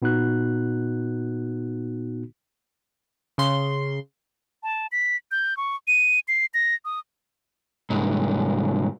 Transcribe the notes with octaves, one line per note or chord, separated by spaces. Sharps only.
A#2 B3 D#4 F#4 F#6
C#3 C6
A5
B6
G6
C#6
D#7
C7
A#6
D#6
C2 G#2